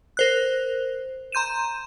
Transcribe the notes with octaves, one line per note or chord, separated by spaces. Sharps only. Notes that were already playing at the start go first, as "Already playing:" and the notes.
A#4 C5 F#6
A#5 C6 G6 D#7 E7